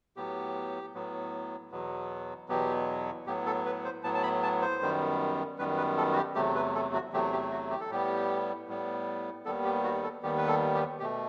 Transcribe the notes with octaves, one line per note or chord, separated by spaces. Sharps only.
A2 F#3 B3 G4
A2 F#3 B3
E2 B2 F#3 B3
E2 B2 F#3 B3 G4
A2 F#3 B3 G4
A4
B4
C5
A2 F#3 B3 A5
A5
B5
A5
C5
F#2 D#3 G3 B3
F#2 D#3 G3 B3 B4
B4
A4
F#4
G4
E2 C3 F#3 A3 G4
B4
A4
F#4
E2 C3 F#3 A3 G4
G4
F#4
G4
A4
A2 G3 B3 G4
A2 G3 B3
D#2 D#3 G3 B3 A4
G4
F#4
A4
D#2 D#3 G3 B3 G4
B4
A4
G4
B2 A3 G4